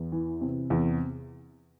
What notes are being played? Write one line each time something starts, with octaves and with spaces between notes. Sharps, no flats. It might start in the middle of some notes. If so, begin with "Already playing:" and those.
Already playing: E2
E3
C3
E2